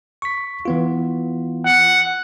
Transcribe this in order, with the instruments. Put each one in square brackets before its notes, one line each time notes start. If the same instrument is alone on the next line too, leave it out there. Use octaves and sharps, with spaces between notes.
[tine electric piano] C#6 B6
E3 B3 F4
[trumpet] F#5